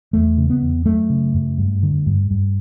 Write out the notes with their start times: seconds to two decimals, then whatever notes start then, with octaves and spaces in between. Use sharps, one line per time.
0.13 E2 A3
0.38 C#3
0.50 B3
0.62 E2
0.86 F#2 A3
1.10 C#3
1.34 F#2
1.58 G2
1.83 D3
2.06 G2
2.31 G2